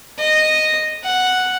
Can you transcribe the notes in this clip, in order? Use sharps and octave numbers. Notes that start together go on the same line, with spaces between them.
D#5
F#5